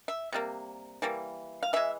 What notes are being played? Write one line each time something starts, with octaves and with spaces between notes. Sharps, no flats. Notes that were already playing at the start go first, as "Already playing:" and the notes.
E5
C3 G3 A#3
E3 G3 A#3
F5
E3 G#3 E5